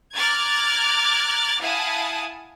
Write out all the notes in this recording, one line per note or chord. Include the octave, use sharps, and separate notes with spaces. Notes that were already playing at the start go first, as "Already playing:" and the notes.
A#5 D6 F6 F#6 G#6 A6
E4 F5 F#5 G#5 A5 D#6